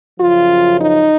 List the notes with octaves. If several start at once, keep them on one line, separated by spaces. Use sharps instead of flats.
F#2 C#3 F3 F4
D#4